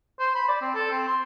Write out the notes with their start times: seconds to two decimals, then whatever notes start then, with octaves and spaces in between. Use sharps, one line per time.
0.19 C5
0.35 B5
0.48 D5
0.61 C4
0.74 A4
0.91 C4
1.07 C6